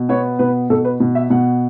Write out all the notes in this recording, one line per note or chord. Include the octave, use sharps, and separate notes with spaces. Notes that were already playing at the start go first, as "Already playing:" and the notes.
Already playing: B2
B3 C#5
B2 B4
B2 A4
B4
B2
E5
B2 F#5